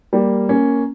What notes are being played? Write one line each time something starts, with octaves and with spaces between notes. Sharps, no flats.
G3 A#3
A#3 C#4